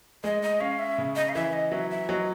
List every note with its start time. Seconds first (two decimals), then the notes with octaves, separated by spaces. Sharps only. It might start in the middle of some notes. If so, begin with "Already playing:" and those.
0.24 G#3 D#5
0.42 D#5
0.60 C#4 F5
0.79 E5
0.98 C#3
1.16 D#5
1.29 F5
1.35 E3 E5
1.53 D#5
1.72 F#3 E5
1.90 E5
2.09 F#3 D#5